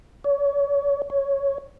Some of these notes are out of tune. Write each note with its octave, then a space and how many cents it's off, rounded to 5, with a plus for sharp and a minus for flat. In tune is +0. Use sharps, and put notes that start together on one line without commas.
C#5 +35
C#5 +0